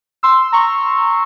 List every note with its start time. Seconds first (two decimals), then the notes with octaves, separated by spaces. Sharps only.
0.23 C6 E6
0.52 A#5 C#6